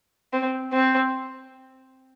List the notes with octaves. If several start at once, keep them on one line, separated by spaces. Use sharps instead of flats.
C4
C4